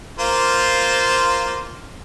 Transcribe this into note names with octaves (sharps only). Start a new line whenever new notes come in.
A#3 F4 C5